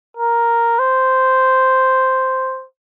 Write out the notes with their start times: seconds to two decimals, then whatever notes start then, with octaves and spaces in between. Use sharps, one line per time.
0.17 A#4
0.79 C5